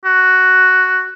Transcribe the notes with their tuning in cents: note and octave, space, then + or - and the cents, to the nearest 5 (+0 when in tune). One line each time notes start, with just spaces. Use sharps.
F#4 +5